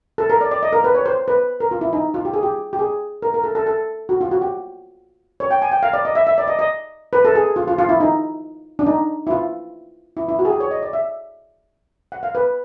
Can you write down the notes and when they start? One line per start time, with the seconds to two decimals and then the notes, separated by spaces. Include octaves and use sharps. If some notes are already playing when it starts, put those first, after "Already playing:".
0.18 A4
0.30 A#4
0.41 D5
0.51 D5
0.63 D#5
0.73 A#4
0.84 B4
0.95 C#5
1.06 C5
1.28 B4
1.60 A#4
1.71 F4
1.81 E4
1.93 D#4
2.14 F4
2.25 G4
2.34 G#4
2.43 G4
2.73 G4
2.79 G#4
3.22 A#4
3.34 A#4
3.44 A4
3.55 A4
3.66 A4
4.09 F#4
4.21 F4
4.31 F#4
4.42 G4
5.40 C#5
5.51 G5
5.62 G#5
5.72 G5
5.83 F5
5.93 D5
6.05 D#5
6.15 E5
6.27 E5
6.38 D5
6.48 D#5
6.59 D#5
7.13 B4
7.25 A4
7.35 G#4
7.56 F4
7.68 F4
7.79 F4
7.89 E4
8.00 D#4
8.79 D4
8.86 D#4
9.27 E4
9.30 F4
10.17 E4
10.29 E4
10.39 F#4
10.45 G#4
10.50 G4
10.60 C#5
10.71 D#5
10.82 D5
10.93 E5
12.12 F#5
12.23 F5
12.35 B4